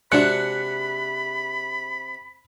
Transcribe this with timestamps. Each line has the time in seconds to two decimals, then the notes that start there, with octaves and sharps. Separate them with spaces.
0.12 C3 G#3 D4 F#4 B5 F#6 C#7